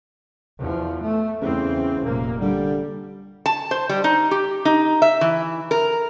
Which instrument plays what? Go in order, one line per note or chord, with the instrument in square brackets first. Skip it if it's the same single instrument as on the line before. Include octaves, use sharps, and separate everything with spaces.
[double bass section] E2 F3
A3
[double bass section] E2 E3 C4 [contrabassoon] C#3
[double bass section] F1 A#2 A#3
[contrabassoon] D3 [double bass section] G3
[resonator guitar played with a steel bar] A5
C5
G3
D#4
G4
D#4
E5
E3
A#4